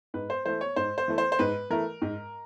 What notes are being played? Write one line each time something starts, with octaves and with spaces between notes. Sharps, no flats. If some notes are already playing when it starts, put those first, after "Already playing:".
G#2 B4
C5
E3 A3 C5
C#5
G#2 C5
C5
E3 A3
C5
C5
G#2 B4
E3 A3 A#4
G#2